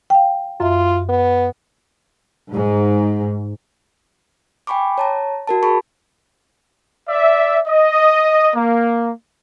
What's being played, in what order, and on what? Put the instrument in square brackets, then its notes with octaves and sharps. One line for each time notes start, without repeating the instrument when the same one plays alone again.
[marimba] F5 G5
[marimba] F#2 E5 [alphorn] F4
[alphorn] B3
[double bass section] G#2
[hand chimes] G5 G#5 B5 C#6 D6
C#5 A5 A#5
F#4 A#4 A5
G#4 A5 B5 C#6
[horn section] D5 E5
D#5
A#3